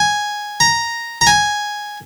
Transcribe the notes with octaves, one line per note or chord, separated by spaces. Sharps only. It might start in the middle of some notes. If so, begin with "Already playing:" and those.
Already playing: G#5
A#5
A#5
G#5